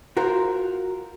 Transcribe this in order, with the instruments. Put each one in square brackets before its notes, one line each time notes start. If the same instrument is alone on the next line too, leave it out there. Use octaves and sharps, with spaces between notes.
[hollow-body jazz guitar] F4 F#4 A#4 C5